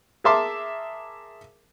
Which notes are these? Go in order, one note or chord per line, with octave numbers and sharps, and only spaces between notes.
G#4 A#4 E5 A5 C6 D6